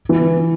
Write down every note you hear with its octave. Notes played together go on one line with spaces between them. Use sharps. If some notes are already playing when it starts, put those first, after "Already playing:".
E3